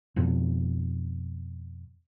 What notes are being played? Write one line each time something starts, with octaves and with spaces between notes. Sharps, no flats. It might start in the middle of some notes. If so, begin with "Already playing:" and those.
F2 B2